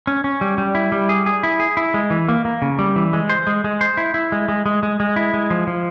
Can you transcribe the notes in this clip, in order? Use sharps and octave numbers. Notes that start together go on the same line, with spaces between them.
C#4
C#4
G3
G3
E4
G3
G#4
G#4
E4
G#4
E4
G#3
E3
A#3
A#3
C#3
G3
E3
G#3
C5
G#3
G#3
C5
E4
E4
G#3
G#3
G#3
G#3
G#3
E4
G#3
F3
F3